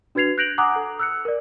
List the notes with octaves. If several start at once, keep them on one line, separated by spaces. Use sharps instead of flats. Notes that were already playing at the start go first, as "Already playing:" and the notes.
D4 F#4 B4 G#6 C7 F7
F#6 G6 A#6 D7 F7 F#7
F#5 G#5 A#5 D6 D#6 F#6
A4
E6 F#6 C#7
A#4 D5